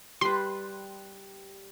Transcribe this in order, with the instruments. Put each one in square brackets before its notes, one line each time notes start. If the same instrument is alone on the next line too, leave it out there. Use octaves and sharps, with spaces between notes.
[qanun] G3 B4 [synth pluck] C6